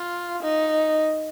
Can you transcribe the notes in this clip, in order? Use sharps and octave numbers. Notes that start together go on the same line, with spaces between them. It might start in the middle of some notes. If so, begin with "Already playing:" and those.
Already playing: F4
D#4